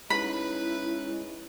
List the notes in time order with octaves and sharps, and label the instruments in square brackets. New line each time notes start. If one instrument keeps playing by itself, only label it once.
[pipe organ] G#3 C#4 D#4 [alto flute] E4 [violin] B4 [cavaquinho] B5